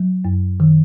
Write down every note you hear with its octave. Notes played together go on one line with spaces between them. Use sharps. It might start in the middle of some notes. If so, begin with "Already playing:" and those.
Already playing: F#3
F#2
D#3